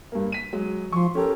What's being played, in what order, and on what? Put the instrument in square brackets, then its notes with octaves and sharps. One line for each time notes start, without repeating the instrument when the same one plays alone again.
[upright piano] G2 A#3
B6 D#7
F#3 G#3
[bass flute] F3 [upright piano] C6 C#6
[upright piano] C#4 G4 A#4 [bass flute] A4